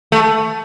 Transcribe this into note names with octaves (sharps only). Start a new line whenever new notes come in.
A3